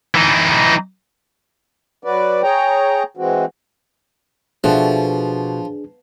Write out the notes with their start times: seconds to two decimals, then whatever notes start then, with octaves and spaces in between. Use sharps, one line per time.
0.15 E3 D#4
2.04 F#3 F#4 B4 D5
2.43 G#4 C#5 G5 A#5
3.17 E3 G#3 C4 F#4
4.64 B2 F3 D4 F#4 G#4 A4 E5